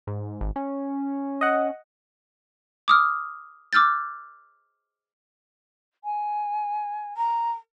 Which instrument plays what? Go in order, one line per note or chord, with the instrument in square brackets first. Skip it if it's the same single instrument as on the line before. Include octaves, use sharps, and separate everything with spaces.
[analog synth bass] G#2
G#1
C#4
[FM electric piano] D#5 F#5
[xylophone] D6 D#6 F6
D6 E6 F6 G6 A6
[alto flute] G#5
[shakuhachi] A#5